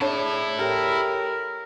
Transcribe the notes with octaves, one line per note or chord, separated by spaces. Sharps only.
D4 E4 G#4 C#5 D5 E5 A5
G4 A4 A#4 C#5 G5